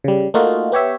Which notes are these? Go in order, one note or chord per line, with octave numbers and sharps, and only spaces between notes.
C#3 G3
A3 A#3 D#4 F4 F#4
B3 G4 C#5 E5